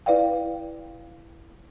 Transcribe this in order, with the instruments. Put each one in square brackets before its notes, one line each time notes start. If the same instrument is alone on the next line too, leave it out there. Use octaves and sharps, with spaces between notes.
[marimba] E4 B4 D5 F5 G5